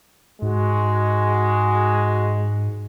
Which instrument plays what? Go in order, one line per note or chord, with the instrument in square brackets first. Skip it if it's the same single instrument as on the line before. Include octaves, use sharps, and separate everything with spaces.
[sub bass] G#2 [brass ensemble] G#3 F#4